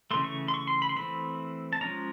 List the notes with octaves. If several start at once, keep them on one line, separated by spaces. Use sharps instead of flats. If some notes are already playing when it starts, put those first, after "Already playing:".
C#3 E3 A3 C6
C#6
C6
C#6
C6
B5
C6
E3 A3 C4 B5
A5
F3 G#3 C#4 A#5